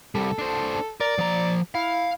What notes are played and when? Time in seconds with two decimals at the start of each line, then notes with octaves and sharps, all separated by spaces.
0.15 C2 G3 A4
0.39 D4 C5
1.01 A#4 D5
1.18 F3 A#5
1.75 E4 F5